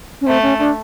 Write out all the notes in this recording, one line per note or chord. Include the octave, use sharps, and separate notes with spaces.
C#4
A3 C4
C#4
D4